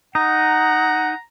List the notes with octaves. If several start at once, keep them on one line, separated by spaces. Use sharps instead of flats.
D#4 F#5 A#5